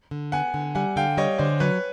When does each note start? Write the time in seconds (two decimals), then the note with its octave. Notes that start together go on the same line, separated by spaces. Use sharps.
0.11 D3
0.32 B3 F#5 G#5
0.54 D3
0.75 G3 F#5 G#5
0.96 D3 F5 G5
1.17 G3 C#5 D#5
1.38 D3 C5 D5
1.60 F#3 B4 C#5